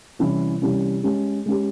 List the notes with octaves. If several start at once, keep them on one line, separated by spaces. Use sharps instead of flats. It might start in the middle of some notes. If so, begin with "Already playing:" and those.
C3 E3 G3 C#4 E4
C3 E3 G3 C#4 E4
G#3 C#4 G4
G#3 C#4 G4